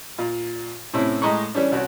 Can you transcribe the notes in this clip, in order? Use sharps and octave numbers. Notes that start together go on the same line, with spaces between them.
A#2
A2 C3 C4 C#4 E4
A2 G#3 D#5 A#5 B5 C#6
E3 G3 C#4 D4
C2 F#4 C#5